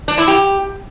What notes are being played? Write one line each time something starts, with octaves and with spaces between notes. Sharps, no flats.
D4
E4
G4